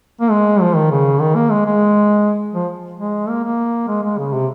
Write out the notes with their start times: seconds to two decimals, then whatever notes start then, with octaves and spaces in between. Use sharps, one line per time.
0.21 A#3
0.31 G#3
0.61 F3
0.76 D#3
0.91 C#3
1.20 D#3
1.35 A#3
1.50 G#3
1.65 G#3
2.54 F3
2.99 G#3
3.29 A#3
3.43 A#3
3.88 G#3
4.03 G#3
4.18 C#3
4.33 C3